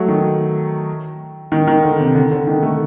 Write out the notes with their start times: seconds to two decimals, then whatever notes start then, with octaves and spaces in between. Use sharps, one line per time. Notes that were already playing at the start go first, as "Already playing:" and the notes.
Already playing: F#3 A3
0.08 D#3
1.52 D#3
1.68 D#3
1.83 D3
2.00 C3
2.15 D3
2.31 D3
2.47 D#3
2.63 A3